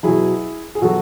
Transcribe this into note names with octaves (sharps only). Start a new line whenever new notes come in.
B2 F#3 E4 G#4
G#4
B2 F#3 F#4 A4